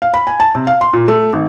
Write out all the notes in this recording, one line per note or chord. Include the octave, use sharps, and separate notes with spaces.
F5
B5
G#5
A5
C3
F5
C6
A#2
A3
G#1